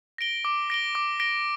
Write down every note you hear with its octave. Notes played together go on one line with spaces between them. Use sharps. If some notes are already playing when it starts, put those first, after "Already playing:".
A#6 D7 G7
D6
A#6 D7 G7
D6
A#6 D7 G7